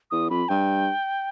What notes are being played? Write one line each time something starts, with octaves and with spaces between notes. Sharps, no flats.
E2 D#6
F2 B5
G2 G5